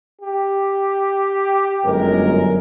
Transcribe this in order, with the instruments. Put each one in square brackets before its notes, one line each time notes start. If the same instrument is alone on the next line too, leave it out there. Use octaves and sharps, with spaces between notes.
[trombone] G4
[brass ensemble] G1 F#2 A#4 [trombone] G#3